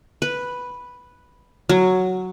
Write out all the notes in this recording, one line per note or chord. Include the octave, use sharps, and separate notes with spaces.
B4
F#3